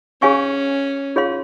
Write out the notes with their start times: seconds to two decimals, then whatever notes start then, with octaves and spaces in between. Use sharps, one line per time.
0.22 C#4 G#4 C#5 F5 G#5 C#6
1.16 F4 G#4 C#5 F5 C6